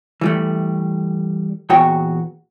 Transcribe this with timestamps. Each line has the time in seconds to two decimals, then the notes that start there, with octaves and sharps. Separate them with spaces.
0.21 E3 G3 A3
1.70 E2 A#2 F#4 C#5 G5